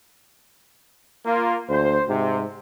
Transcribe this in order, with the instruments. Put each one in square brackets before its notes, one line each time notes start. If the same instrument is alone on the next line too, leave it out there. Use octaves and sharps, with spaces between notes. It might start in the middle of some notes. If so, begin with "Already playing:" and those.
[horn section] A#3 F4
[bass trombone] D2 [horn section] C5
[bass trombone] G#2 [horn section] C3